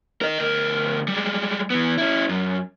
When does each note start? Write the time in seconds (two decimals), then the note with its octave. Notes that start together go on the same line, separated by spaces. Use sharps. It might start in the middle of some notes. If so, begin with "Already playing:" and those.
0.22 A#4 D#5
0.40 D2 A#4
1.08 G3 G#3
1.70 E3 B3
1.98 C#4 E4
2.29 F#2